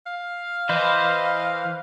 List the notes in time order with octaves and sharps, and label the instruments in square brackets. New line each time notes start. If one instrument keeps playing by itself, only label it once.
[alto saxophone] F5
[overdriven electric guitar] E3 [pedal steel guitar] B4 C5 [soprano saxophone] D#5